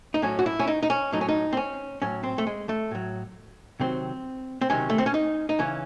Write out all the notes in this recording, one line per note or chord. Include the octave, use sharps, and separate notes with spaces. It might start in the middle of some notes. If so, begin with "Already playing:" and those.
D#4
A2 F#3 C#4
F#4
E4
C#4
D#4
D#4
C#4
A2 F#3 D#4
C#4
D#4
C4
C#4
A2 F#3 C#4
C4
A3
G#3
A3
A2 F#3
C3 D#3 F#3 C4
C4
C3 D#3 F#3 C#4
A3
C4
C#4
D#4
D#4
C#3 E3 C#4